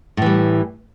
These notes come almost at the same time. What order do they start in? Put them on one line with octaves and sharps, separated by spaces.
A2 E3 G3